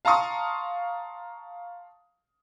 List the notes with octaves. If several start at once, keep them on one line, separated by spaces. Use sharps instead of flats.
F5 A5 A#5 C6 C#6 D#6